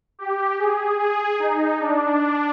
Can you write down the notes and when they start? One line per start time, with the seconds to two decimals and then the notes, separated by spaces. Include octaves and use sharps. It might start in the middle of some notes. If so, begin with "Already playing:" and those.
0.19 G4
0.59 G#4
0.99 G#4
1.39 D#4
1.80 D4